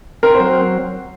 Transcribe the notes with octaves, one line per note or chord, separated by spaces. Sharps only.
C4 A#4
C5
F#3